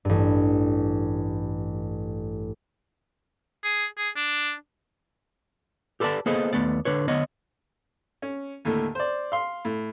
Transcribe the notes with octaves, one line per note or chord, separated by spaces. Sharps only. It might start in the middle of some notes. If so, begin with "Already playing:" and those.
A1 G2
G#4
G#4
D4
G4 A4 B4 C#5 D5 A5
A#3 B3 G#4 A4 C5 D#5
D#2 A3 B3 D5
D3 B4 C#5
D3 B3 C#5 D#5
C#4
D#2 A2 D3
C5 D5
F5 C6
A2